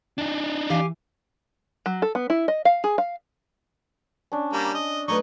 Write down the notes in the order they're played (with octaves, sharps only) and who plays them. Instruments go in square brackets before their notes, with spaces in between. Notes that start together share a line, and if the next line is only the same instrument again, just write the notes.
[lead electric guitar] D4 D#4 [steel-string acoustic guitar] G5 G#5
[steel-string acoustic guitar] E3 [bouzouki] G4 F5 G#5
[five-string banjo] F#3
A4
B3
E4
D#5
F5
G#4
F5
[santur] C#4 D4
[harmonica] G3 A#3
D#5
[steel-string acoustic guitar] F#3 A3 B4 [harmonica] D#4 D#5 C#6